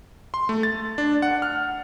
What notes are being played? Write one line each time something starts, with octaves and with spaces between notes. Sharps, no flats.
C6
A3
A6
D4
F#5
F6